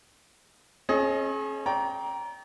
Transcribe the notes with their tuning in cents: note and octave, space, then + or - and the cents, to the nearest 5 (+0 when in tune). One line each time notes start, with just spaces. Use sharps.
C#4 -35 G#4 +35 D#5 +0
D5 -40 G5 -10 A#5 +15